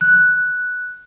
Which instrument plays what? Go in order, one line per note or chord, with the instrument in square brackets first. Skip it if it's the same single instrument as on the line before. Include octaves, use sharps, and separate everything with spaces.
[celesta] F#6